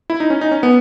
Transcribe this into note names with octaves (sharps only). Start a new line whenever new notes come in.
E4
D#4
C#4
D#4
C#4
B3